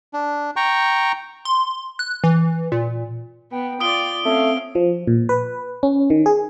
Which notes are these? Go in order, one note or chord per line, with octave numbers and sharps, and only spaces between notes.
D4
G5 A#5 C#6
C6
F#6
E3
A#2
B3 G5
F4 D5 D#6 D7 G7
A3 C4 C#4 F5
F3
A#2
B4
C#4
D#3
G#4